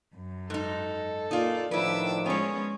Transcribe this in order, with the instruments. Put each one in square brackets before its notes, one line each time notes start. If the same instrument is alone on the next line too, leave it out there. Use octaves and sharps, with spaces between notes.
[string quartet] F#2
[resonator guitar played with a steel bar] G#2 D#4 [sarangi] A4
[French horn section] A#2 [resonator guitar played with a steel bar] D#4 F4 [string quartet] D5
[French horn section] A2 D#3 F3 [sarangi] D4 [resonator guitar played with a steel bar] E4 B4 [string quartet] D6 E6
[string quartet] G#3 C#4 [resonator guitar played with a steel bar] B3 C#5 [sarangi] G#4